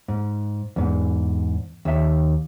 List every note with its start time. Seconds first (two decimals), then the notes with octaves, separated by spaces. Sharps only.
0.08 G#2
0.76 E2 G#2
1.85 D#2 E5